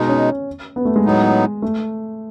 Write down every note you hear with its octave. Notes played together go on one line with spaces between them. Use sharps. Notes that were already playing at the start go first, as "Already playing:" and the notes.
Already playing: B2 G#3 D#4
C#4
B3
A3
G#3
A2 F#3 B3 D#4
A3